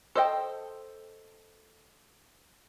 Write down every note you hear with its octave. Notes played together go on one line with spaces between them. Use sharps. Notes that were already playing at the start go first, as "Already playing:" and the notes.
A4 C5 D#5 E5 G5